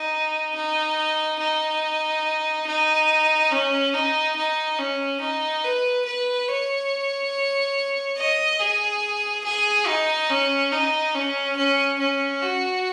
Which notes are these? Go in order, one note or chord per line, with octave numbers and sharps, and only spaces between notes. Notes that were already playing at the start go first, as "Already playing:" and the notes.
Already playing: D#4
D#4
D#4
D#4
C#4
D#4
D#4
C#4
D#4
B4
B4
C#5
D#5
G#4
G#4
D#4
C#4
D#4
C#4
C#4
C#4
F#4